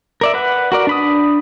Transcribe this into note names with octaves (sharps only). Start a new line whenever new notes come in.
A#4 D5 E5
B4 F#5
F#4 A#4 D5
D4 B5 D#6